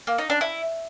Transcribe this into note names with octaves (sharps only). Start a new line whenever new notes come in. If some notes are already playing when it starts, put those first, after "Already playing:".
A#3
D#4
D4
E4